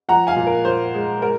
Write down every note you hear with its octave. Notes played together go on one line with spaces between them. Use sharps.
F3 F#5 A#5
F5 G#5
A#2
A#4
A#2 C5
G#3
G#3 A#4